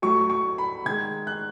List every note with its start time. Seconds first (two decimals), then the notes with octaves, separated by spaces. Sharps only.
0.02 A2 F#3 A3 C#6
0.30 C#6
0.58 B5
0.85 D#3 G#3 G#6
1.27 F#6